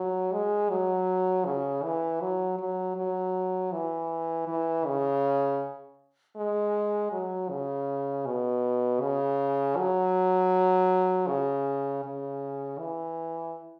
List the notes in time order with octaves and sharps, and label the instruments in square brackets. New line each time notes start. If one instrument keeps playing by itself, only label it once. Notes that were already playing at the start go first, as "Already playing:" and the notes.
Already playing: [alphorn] F#3
G#3
F#3
C#3
E3
F#3
F#3
F#3
E3
E3
C#3
G#3
F#3
C#3
B2
C#3
F#3
C#3
C#3
E3